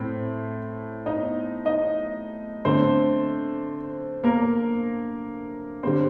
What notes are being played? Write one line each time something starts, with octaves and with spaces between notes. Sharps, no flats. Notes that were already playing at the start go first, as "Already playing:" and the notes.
Already playing: A2 A3 C4
D#4 D#5
D#4 D#5
D3 A3 C4 C5
A#3 A#4
D3 G3 C4 C5